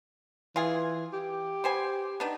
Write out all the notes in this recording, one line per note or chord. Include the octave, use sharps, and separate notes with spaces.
E3 F4 G#4
G4
B3 C5 G#5
B3 D4 D#4